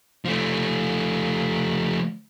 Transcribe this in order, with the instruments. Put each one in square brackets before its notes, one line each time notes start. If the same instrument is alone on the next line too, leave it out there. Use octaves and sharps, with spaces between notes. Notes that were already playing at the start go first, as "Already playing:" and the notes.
[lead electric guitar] F3 A3